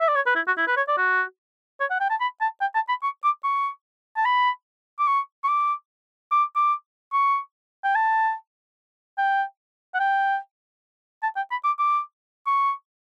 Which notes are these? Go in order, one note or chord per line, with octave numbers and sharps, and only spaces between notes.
E5
D5
C#5
B4
E4
F#4
E4
B4
C#5
D5
F#4
C#5
F#5
G5
A5
B5
A5
G5
A5
B5
C#6
D6
C#6
A5
B5
D6
C#6
C#6
D6
D6
D6
C#6
G5
A5
G5
F#5
G5
A5
G5
B5
D6
D6
C#6